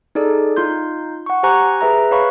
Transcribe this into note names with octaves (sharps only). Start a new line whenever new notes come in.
D#4 G#4 A4 D5
D#4 F4 C6 G6
F#5 C#6
G4 C5 G#5 A#5 C#6 F#6
G#4 B4 E5 A#5
B4 C#5 F5 B5 C#6